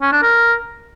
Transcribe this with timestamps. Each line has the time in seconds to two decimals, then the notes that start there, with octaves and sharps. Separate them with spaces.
0.02 C#4
0.12 D4
0.22 A#4